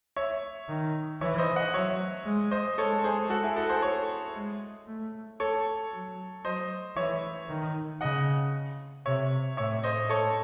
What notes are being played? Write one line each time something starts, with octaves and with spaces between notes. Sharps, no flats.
C#5 E5
D#3
E3 C#5 E5
C5 D#5
D#5 F#5
F#3 C#5 E5
G#3
C5 D#5
G#3 A4 C#5
G#4 C5
F#4 A4
E4 G#4
F#4 A4
G#4 C5
A4 C#5
G#3
A3
A4 C#5
F#3
F#3 C5 D#5
E3 C#5 E5
D#3
C#3 D#5 F#5
C3 C#5 E5
A2 C#5 E5
C5 D#5
A2 A4 C#5